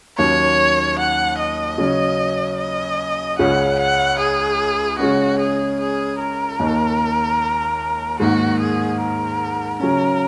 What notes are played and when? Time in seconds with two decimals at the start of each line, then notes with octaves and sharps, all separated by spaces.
0.18 D#2 D#3 F#3 A#3 C#4 C#5
0.99 F#5
1.39 D#5
1.78 C#3 F#3 C#4
2.58 D#5
3.38 C#2 C#3 G#3 C#4 F#5
3.79 F#5
4.19 G#4
4.99 C#3 G#3 C#4 F#4
5.39 G#4
5.80 G#4
6.20 A#4
6.59 D#2 D#3 A#3 D#4
8.19 G#2 D#3 A#3 F#4
8.61 G#4
9.00 A#4
9.80 C#3 F#3 C#4 A#4